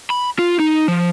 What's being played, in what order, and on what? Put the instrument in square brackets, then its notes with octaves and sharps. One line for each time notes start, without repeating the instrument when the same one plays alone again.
[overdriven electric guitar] B5
F4
D#4
F3